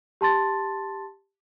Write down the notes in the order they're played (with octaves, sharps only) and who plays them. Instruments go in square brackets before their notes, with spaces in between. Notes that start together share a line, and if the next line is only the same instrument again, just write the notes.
[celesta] G4 A5 C6 A6